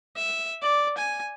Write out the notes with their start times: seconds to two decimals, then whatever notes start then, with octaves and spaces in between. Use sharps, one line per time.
0.17 E5
0.62 D5
0.98 G#5